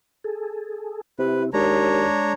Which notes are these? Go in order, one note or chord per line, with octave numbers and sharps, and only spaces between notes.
G#4 A4
C3 C4 E4 B4
D#2 G#3 D4 C#5 A#5